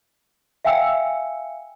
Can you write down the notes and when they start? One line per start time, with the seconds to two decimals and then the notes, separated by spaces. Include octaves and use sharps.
0.65 E5 F5 G5 G#5 E6 C#7